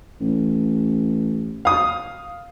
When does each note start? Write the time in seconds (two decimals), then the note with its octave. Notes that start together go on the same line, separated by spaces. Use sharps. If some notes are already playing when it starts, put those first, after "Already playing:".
0.20 A1
1.65 F5 D#6